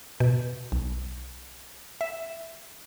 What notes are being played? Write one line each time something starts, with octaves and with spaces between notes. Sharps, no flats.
B2
B1
E5